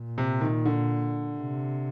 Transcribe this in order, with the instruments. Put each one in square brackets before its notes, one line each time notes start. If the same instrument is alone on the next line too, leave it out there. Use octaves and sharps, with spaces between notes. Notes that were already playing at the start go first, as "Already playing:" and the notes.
Already playing: [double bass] A#2
[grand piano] C3
D#3
D3
[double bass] C3